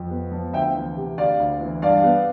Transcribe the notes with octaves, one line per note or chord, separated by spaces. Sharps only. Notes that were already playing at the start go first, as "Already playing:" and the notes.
Already playing: F2
B3
F3
D2 E5 G5
E3
C3
D2 D5 F5
D2
E3
G2 D5 F5
B3